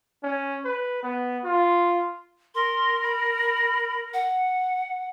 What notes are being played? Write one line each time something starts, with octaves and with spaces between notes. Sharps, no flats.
C#4
B4
B3
F4
A#4 C6
B5
F#5